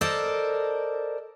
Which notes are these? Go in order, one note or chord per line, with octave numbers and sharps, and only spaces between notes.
A4 A#4 C5 D5 D#5